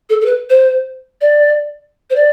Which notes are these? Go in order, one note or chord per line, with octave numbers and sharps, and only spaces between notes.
A4
A4
B4
C5
D5
C5
D5